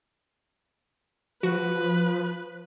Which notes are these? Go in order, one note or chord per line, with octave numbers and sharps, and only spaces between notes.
F3 F#4 B4